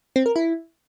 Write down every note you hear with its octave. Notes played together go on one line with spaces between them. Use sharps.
C4
A#4
E4